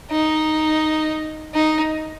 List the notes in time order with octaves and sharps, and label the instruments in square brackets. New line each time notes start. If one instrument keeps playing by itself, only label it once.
[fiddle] D#4
D#4